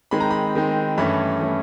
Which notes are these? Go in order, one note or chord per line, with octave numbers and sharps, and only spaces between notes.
D#3 G#3 C4 D#4 B5
A#5
B5
D#3 G#3 C4 D#4
G2 E3 A3 C#4 B5
E3 A3 C#4